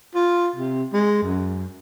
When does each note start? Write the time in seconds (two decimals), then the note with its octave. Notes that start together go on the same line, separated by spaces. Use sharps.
0.15 F4
0.56 C3
0.93 G#3
1.23 F#2